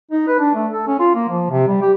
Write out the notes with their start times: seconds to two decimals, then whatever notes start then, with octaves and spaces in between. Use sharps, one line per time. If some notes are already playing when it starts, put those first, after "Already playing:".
0.11 D#4
0.28 B4
0.39 D4
0.55 A3
0.72 A4
0.87 C#4
1.00 F4
1.15 A#3
1.29 F3
1.50 C3
1.68 G3
1.82 G4